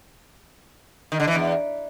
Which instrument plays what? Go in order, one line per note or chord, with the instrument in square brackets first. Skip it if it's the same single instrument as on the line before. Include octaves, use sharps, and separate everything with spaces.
[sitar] D#3
D3
E3
E2